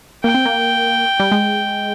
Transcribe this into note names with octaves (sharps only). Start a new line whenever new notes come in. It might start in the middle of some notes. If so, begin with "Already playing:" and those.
A#3 G5
C4
A#3
G3
G#3